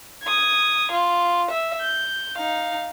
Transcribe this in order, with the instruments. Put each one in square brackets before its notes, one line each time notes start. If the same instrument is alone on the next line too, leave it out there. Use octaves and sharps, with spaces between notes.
[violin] D#6 G#6
F4
E5
G6
D#4 F5